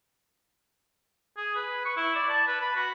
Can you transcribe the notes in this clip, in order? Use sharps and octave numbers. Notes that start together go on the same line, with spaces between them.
G#4
B4
C#6
E4
D5
A5
B4
B5
F#4